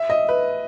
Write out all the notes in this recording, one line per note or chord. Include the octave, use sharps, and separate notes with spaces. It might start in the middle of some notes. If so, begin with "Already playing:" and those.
Already playing: E5
D#5
B4